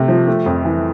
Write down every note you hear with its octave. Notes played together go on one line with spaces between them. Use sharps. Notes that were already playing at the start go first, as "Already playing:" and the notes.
Already playing: C3 A3
F3
A3
F2
E3